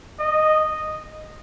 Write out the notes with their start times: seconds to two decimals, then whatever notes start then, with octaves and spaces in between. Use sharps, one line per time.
0.19 D#5